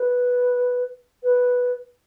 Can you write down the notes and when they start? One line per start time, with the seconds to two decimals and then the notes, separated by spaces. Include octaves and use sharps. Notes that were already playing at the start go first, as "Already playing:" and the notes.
Already playing: B4
1.23 B4